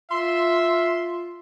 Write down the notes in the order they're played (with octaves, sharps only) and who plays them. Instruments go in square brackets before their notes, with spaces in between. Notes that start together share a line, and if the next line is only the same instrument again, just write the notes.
[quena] F4 [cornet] E5 [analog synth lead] C6